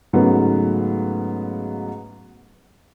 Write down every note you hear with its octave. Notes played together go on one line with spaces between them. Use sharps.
G#2 C#3 F#3 A3 B3